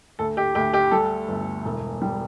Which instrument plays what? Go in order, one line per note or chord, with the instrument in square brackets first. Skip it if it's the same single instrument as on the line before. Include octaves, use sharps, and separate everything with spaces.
[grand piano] D2 A4
G4
D2 G4
G4
G3 A4
G1
E1
G3